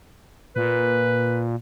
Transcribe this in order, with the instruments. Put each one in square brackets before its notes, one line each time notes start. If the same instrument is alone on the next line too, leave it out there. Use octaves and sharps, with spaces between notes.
[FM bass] A#2 [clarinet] B4